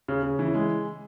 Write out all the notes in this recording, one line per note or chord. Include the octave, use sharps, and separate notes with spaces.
C#3
C#3
E3
G#3